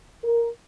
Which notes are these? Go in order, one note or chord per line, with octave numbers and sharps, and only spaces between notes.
A#4